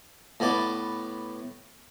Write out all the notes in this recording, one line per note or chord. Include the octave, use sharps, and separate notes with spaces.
A2 B3 D5